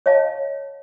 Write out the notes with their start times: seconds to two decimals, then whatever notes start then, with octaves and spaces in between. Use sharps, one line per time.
0.06 C#5 D#5 F5 A5